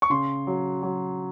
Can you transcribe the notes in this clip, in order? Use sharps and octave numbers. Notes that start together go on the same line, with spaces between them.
C#6
C#3 C6
F#3
F#3